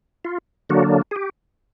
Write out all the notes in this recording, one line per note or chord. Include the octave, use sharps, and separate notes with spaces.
F4
D3 F#3 A#3 D4 F#4
G#4
G4